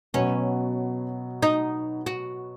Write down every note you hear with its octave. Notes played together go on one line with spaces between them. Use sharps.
B2 F#3 B3 C#4
D#4
F#4